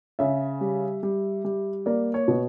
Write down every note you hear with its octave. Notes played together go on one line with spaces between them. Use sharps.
C#3 E5
G3
G3
G3
A#3 D5
C#5
B2